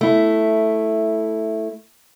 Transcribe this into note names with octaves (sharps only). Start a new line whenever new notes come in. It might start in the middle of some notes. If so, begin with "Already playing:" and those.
A3 E4